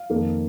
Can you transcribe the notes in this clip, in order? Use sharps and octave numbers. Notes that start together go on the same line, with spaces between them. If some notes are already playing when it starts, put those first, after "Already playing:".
Already playing: F5
F2 D#3 A#3